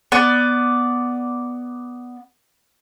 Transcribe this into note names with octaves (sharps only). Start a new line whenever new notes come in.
B3 D5